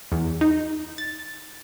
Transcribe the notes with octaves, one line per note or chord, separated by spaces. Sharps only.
E2
D#4
A6